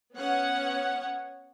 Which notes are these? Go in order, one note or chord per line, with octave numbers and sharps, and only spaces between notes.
B3 C#4 C#5 F#5